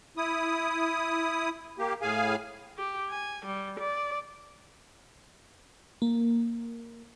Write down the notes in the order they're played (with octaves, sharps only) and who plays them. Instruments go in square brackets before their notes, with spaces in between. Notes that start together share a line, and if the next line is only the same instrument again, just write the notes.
[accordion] E4 D#6
A#3 G4
A2 G#4 F5 G#5
[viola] G4
G#5
G3
D5
[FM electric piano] A#3